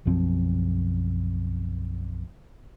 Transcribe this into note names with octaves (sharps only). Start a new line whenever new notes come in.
B1 F#2 F3 C4